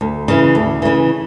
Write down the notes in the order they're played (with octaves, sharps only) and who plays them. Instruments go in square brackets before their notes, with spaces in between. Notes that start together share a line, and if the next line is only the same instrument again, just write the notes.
[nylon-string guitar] D2
C#3 E3
D2
C#3 E3